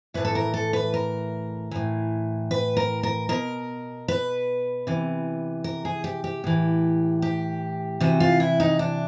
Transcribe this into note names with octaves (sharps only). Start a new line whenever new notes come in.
A2 E3 B4
A4
A#4
A4
B4
A#4
A2 E3
B4
A#4
A#4
B2 A#4
B4
C3 E3
A#4
G#4
G4
G4
A2 E3
G4
C3 E3 F#4
F4
E4
D#4
D4